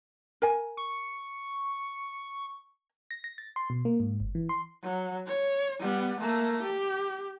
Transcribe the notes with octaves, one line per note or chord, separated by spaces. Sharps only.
A#4 G#5
C#6
A#6
A#6
A6
C6
B2
A#3
G#2
G1
E3
C6
F#3
C#5
G3 B3
A3 A#3
G4